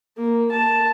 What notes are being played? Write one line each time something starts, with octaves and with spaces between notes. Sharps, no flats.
A#3
A5